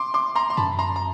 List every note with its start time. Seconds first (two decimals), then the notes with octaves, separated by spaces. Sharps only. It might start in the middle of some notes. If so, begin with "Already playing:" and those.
Already playing: C6 D6
0.14 C6 D6
0.35 A#5 C6
0.50 C6
0.57 F#2 A5 B5
0.79 A#5 C6
0.96 A#5